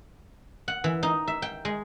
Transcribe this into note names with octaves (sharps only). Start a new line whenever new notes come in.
F#5
E3
D#4
E5
G5
G#3